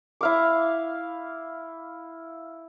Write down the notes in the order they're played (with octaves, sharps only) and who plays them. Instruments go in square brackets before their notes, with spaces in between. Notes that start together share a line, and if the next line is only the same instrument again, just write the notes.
[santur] E4 F5 D6